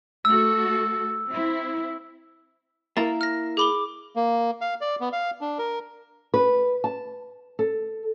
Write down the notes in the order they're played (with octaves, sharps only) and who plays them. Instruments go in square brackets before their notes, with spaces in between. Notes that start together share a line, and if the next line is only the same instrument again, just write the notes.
[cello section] A3 F#4 A4 [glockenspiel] E6
[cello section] C4 E4
[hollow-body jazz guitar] A#3 E4 A#4 [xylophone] A6
[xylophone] F6 A#6
[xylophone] G#4 B5 G7 [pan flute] D6
[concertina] A#3
F5
D5
B3
F5
D4
A#4
[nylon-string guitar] B4
A5
A4